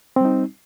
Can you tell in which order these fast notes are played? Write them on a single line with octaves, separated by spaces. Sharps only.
C4 G3 D#4